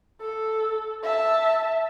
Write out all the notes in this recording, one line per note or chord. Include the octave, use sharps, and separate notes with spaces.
A4
E5 A5